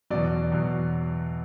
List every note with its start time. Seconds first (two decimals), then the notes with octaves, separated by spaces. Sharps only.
0.10 E2 B2 F#3 D5
0.52 E2 B2 F#3